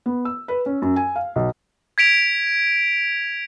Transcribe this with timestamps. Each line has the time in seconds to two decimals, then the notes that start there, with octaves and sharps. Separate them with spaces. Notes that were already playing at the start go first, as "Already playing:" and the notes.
0.06 B3
0.25 E6
0.48 B4
0.66 C#4
0.82 F#2
0.96 G#5
1.16 F5
1.36 B1
1.98 G#6 B6 D7 F7